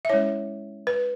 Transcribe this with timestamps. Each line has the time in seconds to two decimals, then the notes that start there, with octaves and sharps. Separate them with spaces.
0.05 E5
0.09 G#3 C#4 E4 C#5
0.87 B4